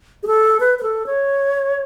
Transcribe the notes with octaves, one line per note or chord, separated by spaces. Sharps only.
G#4
A4
B4
B4
A4
C#5